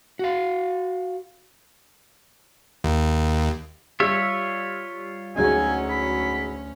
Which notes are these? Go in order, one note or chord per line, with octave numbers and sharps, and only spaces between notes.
F#4 F5
D#2
G3 F4 C#5 E5 E6
D2 F#3 G#3 C#4 D#4 G#5
B5